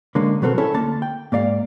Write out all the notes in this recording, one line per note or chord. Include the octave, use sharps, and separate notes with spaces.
D3 G#3 A#3 C#4
B2 F#3 B3 C4 A4 A#4
C#4 E4 A4 C#5
D2 A#3 A5
G5
G#2 A#3 D5 F5